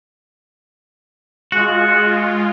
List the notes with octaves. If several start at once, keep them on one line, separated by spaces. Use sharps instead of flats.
G#3 F4 F#4